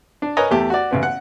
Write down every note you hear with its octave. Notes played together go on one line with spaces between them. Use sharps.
D4
A#4 B4 C#5 D#5 G#5 A#5
E2 A3 G4 D6
F#4 D5
A1 C#3 B3
F#5